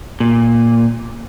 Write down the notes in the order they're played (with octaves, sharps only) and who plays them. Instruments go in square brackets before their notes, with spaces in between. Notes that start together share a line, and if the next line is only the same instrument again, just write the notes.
[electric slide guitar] A#2